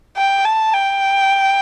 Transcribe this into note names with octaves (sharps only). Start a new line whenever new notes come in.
G5
A5
G5